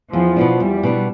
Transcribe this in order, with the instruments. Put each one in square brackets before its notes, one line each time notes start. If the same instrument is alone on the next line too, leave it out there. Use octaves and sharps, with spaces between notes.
[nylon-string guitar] E2 [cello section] F3
[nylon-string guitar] B2 B3 D4
[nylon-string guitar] E2 [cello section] G3
[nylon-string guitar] B2 B3 D4